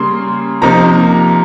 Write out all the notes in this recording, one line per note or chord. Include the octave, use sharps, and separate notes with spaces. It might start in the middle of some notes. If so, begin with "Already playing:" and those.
Already playing: C#3 G3 A#3 C6
C3 F3 A#3 D#4 A#5